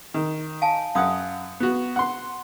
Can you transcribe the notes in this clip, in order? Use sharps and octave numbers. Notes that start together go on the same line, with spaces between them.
D#3
F5 G#5 A5
F#2 F5 F#5 D#6
B3 F#4
F#5 C6